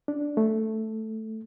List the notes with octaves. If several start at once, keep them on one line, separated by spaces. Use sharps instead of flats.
D4
A3